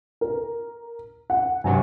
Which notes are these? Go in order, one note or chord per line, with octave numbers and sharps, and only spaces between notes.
A#4
F#5
G2 C3 F#3 G#5